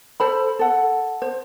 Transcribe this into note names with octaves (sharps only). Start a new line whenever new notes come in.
A4 C5 B5
A4 F#5
C5